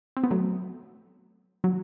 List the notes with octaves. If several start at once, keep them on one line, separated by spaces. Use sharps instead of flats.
C4
B3
F#3 A3
F#3